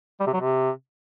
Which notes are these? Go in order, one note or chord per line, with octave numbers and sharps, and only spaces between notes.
G3
C3
F#3
C3